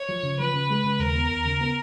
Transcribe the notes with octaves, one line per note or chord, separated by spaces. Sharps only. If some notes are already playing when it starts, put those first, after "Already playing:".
Already playing: C#5
F3
C#3
F3 B4
C#3
G#3
C#3
D#2 A#4
B3
D#2
C#3
B3